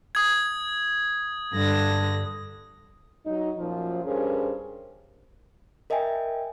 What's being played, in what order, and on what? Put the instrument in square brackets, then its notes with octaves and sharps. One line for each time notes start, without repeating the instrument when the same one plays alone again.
[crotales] D#6 G#6
[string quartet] G2 D3 A#6
[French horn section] F#3 D#4
F#2 A#2 F3
G2 C#4 G#4 A#4 C5
[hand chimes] A#4 D#5 E5 G5 G#5